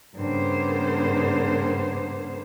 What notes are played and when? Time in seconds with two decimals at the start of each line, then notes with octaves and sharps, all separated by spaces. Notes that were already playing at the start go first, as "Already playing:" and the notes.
0.15 G2 C#3 A#3 B3 C5